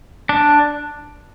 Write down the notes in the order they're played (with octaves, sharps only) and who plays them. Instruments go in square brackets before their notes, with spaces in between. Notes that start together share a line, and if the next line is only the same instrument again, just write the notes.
[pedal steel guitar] D4